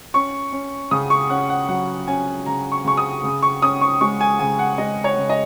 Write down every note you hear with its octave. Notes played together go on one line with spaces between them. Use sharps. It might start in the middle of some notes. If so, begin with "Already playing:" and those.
C#4 C#6
C#4
C#3 D#6
C#6
C#4 F#5
F#5
F#3 F#5
C#4 G#5
C#3 A#5
C#6
C#3 C#6
D#6
C#3
C#6
C#4 D#6
C#6
G#3 C#6
G#5
C#3 G#5
F#5
G#3 D#5
C#5
C#3
D#5